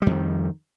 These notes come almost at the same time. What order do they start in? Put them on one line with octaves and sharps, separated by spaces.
G3 F2 D#3